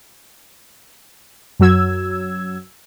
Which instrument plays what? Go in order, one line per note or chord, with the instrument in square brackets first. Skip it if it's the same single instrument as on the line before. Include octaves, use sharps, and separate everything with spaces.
[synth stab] F#2 F#3 E6 G#6